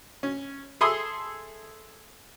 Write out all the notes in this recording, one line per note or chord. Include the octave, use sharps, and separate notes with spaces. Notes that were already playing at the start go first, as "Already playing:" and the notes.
C#4
G#4 A4 E5 C6 D#6